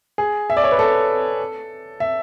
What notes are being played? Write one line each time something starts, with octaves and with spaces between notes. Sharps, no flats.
G#4
E5
D5
C#5
B4
A4
E5